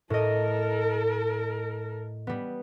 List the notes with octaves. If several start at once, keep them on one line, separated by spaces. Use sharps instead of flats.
A2 A4 A#4 D#5
G3 B3